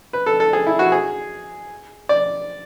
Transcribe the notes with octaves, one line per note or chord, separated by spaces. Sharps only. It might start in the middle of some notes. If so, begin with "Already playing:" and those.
B4
A4
A4
G#4
E4
F#4
G#4
D5